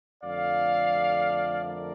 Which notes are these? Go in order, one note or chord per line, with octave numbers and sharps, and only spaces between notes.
F2 D3 A3 D5 F5
A#4 D5